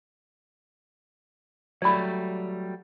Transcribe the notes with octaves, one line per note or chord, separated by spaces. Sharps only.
F#3 G3 A3 D5 B5